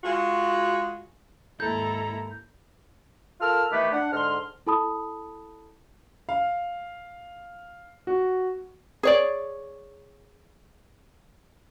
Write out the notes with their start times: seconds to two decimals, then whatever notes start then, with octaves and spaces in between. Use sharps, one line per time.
0.04 G#3 F4 F#4
1.60 D#2 G#2 E4 A4 A#5 G6
3.41 F4 A4 A#4 E6 F6
3.71 D#3 E3 A3 B3 G4 B4
3.93 D4 F#5
4.13 G#2 D3 C6 F6
4.67 E4 A4 A5 B5 D#6
6.29 F5
8.07 F#4
9.03 G#4 C#5 D5